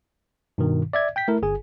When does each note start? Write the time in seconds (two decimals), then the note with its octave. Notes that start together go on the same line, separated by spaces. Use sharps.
0.58 G2 B2 D#3
0.93 D5 E5 G#6
1.16 G5 G6 B6
1.28 A3 E4 A#4
1.42 G1 G#4 G#5